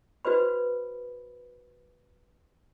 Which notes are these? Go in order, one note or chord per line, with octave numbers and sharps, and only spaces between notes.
F#4 B4 C5 B5